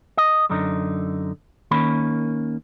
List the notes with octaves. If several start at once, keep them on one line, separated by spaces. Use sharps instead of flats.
D#5
F#2 D3 D#4
D#3 A#3 C#4 B5